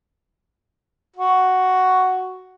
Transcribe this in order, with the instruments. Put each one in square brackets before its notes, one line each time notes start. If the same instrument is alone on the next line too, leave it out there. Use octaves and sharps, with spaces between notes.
[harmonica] F#4